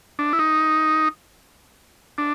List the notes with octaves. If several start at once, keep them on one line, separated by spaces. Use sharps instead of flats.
D4
E4
D#4
D4